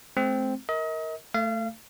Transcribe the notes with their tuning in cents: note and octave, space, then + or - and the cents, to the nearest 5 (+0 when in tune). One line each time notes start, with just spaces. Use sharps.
A3 -45 C4 +0
A#4 +0 D#5 +35
A3 +10 F5 -35